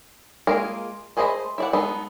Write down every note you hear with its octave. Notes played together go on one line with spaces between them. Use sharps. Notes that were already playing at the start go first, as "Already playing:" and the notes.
G#3 A#3 F4 G#4 A#4
A3 G#4 C5 D#5 B5
E4 D5 F#5
G#3 B3 D#4 A4